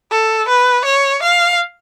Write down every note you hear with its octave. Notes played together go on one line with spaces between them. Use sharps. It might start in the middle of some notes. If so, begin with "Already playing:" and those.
A4
B4
C#5
F5